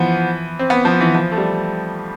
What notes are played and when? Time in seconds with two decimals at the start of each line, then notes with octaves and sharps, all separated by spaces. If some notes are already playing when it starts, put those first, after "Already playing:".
Already playing: E3 F3 B3
0.59 C4
0.70 B3
0.85 F3
1.01 E3
1.15 F3
1.32 A3
1.37 G3